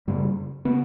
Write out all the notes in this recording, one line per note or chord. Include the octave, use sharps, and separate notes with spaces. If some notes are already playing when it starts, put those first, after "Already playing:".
F#2 C#3 G3
C#3 B3